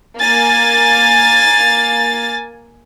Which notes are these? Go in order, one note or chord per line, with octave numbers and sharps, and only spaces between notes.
A#3 G#5 A6